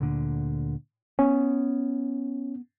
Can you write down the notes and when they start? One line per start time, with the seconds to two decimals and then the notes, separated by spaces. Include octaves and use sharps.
0.01 D2 A#2 D3
1.19 B3 C#4